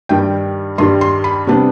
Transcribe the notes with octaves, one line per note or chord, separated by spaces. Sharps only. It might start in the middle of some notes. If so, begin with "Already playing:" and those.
G2 D#3 G3 G5
G2 D#3 G3 C6
C6
B5
C3 G3 B3 D4